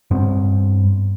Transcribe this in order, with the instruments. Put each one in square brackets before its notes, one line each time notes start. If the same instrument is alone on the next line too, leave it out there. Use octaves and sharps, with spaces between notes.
[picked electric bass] G2 B3 C4